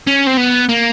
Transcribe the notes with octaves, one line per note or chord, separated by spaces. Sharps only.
C#4
C4
B3
A#3